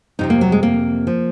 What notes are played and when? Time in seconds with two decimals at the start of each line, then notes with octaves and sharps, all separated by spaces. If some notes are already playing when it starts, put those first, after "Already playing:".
0.19 F2 C3 F3 D#4
0.30 A#3
0.41 F#3
0.52 G#3
0.63 A#3
1.07 F3